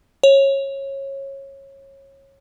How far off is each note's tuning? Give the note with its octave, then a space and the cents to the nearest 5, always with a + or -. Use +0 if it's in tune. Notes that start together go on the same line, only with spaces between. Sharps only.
C#5 -20